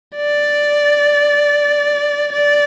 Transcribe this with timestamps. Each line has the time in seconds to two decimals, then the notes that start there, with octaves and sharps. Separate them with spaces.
0.16 D5
2.32 D5